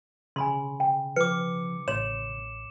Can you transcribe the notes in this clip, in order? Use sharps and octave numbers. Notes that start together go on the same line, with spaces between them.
C#3 G#5 B5 C6
G5
F3 B4 D6 C#7
A1 C#5 C6 E7